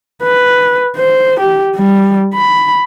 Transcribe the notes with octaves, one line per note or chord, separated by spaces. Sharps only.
B4
C5
G4
G3
B5